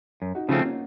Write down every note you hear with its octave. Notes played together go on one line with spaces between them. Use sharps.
F#2
D#4 F#4
C#3 F3 A3 C4 C#4 F4
A#3 C#4